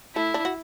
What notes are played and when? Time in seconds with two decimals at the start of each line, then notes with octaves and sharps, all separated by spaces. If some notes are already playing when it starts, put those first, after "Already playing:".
0.15 A3 E4
0.34 D4
0.45 F#4